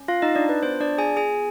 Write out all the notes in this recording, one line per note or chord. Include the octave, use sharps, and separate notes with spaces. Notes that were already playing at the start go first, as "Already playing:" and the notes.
Already playing: C#4
F4 F5
D#4 D#5
D4 D5
B4
B3 D4 F4 C5
D4 D5
G#4 G#5
G#4 G#5